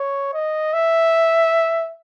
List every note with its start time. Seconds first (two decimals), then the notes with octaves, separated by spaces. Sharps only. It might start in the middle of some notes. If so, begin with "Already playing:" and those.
Already playing: C#5
0.33 D#5
0.73 E5